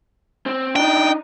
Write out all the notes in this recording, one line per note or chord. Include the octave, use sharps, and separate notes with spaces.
C4
D4 D#4 G5